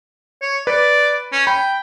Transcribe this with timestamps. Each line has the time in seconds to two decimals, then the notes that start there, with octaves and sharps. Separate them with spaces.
0.42 C#5
0.67 B4 D5
1.32 C#4
1.47 G5 B5